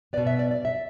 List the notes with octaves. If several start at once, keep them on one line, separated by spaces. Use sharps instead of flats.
B2 B3 D5
E5
D5
D5
E5